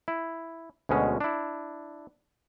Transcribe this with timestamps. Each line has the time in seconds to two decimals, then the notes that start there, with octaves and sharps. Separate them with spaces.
0.08 E4
0.89 D2 B2 G#3 C#4
1.20 D4 E4